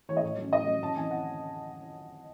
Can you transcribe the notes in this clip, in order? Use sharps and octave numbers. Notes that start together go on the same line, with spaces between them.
E3 G#3 C#5
D#5
A2 C#5
F#3 C#4
A2 D#5
F#3 C#4
F#2 A5
E3 C4 G#5
F#5